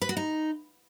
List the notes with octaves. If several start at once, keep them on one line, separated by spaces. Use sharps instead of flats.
B4
F#4
D#4